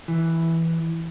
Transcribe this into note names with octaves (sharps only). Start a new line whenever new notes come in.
E3